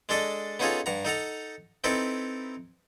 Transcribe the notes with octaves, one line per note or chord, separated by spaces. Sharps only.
G#3 D4 A4 D#5
B3 C#4 D#4 F4 G#4 A4
G2 F#5 A#5
D#4 A4 F#5 A#5
C4 D#4 E4 A4 B4